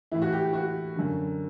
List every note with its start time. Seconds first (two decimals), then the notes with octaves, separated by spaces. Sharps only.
0.12 A2 E3 E4
0.22 F#4
0.32 G4
0.43 G4
0.53 F#4
0.96 F#2 D3